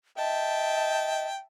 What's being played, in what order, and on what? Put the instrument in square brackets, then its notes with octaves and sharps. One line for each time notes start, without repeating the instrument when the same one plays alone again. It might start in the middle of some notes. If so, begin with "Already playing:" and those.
[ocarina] D#5 [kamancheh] E5 A5 [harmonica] G5